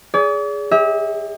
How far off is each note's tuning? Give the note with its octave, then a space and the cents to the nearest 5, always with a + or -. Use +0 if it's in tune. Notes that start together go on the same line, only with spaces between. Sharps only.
G#4 +0 D5 -45
G4 +40 E5 -35